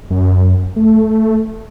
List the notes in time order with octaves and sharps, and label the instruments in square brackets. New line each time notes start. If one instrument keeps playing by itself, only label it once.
[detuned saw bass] F#2
A3